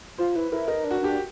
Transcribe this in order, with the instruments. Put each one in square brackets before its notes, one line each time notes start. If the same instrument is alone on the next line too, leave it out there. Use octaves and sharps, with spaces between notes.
[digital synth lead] F4 [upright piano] C5
[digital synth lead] E4 [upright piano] B4
[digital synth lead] E4 [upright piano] A#4
[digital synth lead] D#4 [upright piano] A#4
[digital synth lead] D4
[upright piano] F#4
[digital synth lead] D4 [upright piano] G4